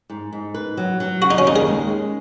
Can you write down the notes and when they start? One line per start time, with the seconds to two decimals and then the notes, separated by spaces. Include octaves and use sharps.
0.10 G#2
0.33 G#2
0.54 B4
0.77 F#3
1.00 F#3
1.22 C#3 F#4
1.31 D#4
1.38 C#4
1.45 D#2 D#4
1.56 G#4
1.67 G#3
1.89 C#4